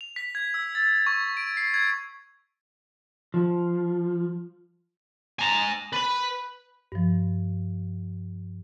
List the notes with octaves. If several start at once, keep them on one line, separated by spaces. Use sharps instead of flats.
F7
B6
G#6
E6
A6
C#6
D7
C7
G#6
F3
G#5 A#5
B4 B5
G2 F3